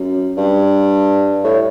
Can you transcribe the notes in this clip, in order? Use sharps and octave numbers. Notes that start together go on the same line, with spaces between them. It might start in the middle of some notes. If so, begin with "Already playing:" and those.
Already playing: F#2
G2
A2